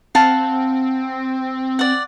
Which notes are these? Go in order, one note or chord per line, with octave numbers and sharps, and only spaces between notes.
C4 F5 F#5 A5
D5 F#5